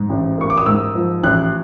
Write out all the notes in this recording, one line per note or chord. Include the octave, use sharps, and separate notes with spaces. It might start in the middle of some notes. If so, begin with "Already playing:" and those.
Already playing: G#2
A1
A#3 C#6
D6
D#6
G#2 E6
F3
A1 F#6